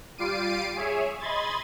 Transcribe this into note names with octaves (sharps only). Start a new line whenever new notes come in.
G3 F4 D6 C7 D7 D#7
G#4 C#5 E5
D#5 B5 C6 G#6 A6